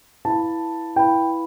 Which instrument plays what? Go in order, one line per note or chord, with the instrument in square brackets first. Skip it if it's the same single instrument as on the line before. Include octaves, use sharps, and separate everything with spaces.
[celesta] E4 B4 F5 B5 [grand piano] A5
[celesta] E4 B4 F5 B5 [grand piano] G5